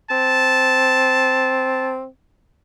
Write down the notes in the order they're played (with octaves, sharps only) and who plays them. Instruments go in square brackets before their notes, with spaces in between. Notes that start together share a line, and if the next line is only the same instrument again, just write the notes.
[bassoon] C4 [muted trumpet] A5